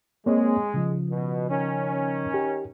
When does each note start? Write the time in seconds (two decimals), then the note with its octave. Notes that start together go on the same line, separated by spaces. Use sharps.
0.26 G#3 A#3 C4 C#5
0.74 C#3 F3
1.11 B2
1.50 D#3 C#4
2.34 G4